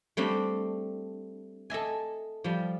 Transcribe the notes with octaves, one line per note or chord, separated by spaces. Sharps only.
G3 A3 C4 D4
A4 D#5 E5 G#5
F3 G3